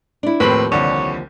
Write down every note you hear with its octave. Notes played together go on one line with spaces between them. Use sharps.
D4 E4
D#2 A2 F3 C4 G4 B4 F#7
C2 D3 C#5